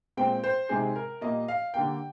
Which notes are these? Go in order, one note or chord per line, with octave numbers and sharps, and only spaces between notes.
A#2 G#3 C4 G5
C5
C3 D#3 G#3 C4 G#4
A#4
A#2 G3 A#3 D#5
F5
D3 G3 A#3 G5